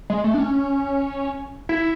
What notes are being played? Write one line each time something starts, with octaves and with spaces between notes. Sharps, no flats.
G#3
A3
D4
C#4
E4